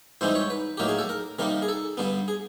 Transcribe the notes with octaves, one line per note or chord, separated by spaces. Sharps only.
G#2 E3 G3 C4 D#4 C5
C#5
B4
A2 F#3 A#3 D#4 G4
G#4
A4
A#4
C3 D#3 G3 A#3 D#4 A#4
G#4
A4
G2 D3 G3 B3
G#4